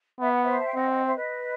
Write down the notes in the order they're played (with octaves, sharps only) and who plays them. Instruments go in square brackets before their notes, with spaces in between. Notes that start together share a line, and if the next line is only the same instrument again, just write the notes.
[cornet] B3 [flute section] E5
[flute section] F#5
C5 E5
A5
G5
[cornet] C4 [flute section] D#5 F#5
[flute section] D#5 F#5
C5 E5
B4 D#5